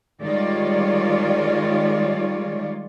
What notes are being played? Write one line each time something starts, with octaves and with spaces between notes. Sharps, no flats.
D#3 G3 G#3 F4 C#5 D5